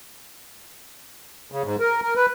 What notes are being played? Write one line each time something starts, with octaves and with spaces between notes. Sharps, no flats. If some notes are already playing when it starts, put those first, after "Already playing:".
C#3
G#2
A#4
A#4
B4